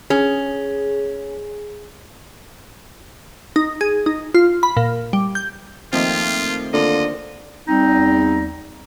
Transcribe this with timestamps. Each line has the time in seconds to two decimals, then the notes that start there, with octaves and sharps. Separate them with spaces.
0.10 C#4 G#4
3.56 D#4
3.81 G#4
4.06 D#4
4.35 F4
4.63 B5
4.77 A#2
5.13 G3
5.35 G6
5.93 D#3 F3 A3 A#3 C4 F4 D#5
6.73 D3 A#3 F4 D#5
7.68 E2 G3 C4 D#4